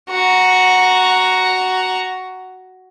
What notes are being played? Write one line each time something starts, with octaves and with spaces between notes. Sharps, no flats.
F#4 A#5